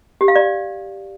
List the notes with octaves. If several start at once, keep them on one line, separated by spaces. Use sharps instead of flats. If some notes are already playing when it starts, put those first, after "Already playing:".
G4
F5
D5